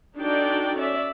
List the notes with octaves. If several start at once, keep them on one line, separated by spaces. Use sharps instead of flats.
D4 D#4 F#4 A4 D5 G5
C#4 D5 E5